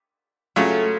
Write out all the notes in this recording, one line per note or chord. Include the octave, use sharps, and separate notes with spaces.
C#3 F#3 A3 C#4 F4